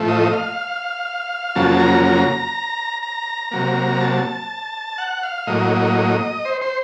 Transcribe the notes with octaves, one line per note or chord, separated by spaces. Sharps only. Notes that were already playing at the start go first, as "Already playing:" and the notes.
Already playing: A2 F3 A3
D#5
F5
F2 C#3 F#3 A#3 A5
A#5
A#5
A#5
C3 F#3 A#3
A5
F#5
F5
A2 F#3 A#3 D#5
C5
C5